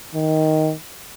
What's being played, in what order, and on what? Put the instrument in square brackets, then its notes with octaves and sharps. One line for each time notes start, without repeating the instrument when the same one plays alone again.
[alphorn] D#3